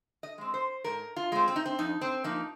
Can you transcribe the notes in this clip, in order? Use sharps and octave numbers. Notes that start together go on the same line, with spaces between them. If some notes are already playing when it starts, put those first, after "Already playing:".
D#5
G#3 C4
C5
G#2 A#4
F4
G#3 C4
C4
D#4
C4
F2 D#4
C4
F3 A#3 D#4